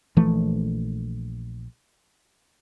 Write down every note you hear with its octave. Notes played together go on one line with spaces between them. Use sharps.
A#1 E3 F3 A3